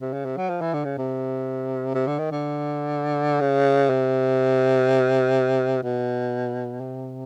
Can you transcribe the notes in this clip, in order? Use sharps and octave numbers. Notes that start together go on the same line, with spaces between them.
C3
C#3
C3
F#3
F3
E3
D3
C#3
C3
C3
D3
D#3
D3
C#3
C3
B2
C3